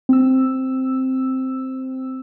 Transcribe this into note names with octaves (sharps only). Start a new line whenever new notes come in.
C4 E6